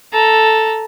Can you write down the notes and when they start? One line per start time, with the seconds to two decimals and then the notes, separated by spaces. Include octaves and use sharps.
0.12 A4 A#5